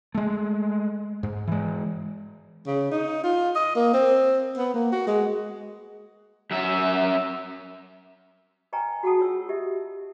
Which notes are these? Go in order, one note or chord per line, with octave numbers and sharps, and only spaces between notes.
G#3 A3
G#2
E3 G#3
C#3
D#4
F4
D#5
A#3
C4
B3
A#3
F#4
G#3
F#2 E5
B4 D#5 G5 G#5 A#5 C#6
F#4 G#4 F#5 G5 A5 D#6
F4 C#5 E6
G4 D#5 E5